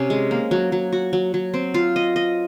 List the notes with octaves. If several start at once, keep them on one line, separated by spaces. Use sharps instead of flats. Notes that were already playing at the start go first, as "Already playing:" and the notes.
Already playing: C3 C#4
G#3
A#3
F#3
F#3
F#4
F#3
F#3
C4
F4
D#5
D#5